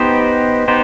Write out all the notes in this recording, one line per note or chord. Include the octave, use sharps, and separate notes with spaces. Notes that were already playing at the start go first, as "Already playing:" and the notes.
Already playing: B3 D#4 G4 C5
B3 D#4 G4 C5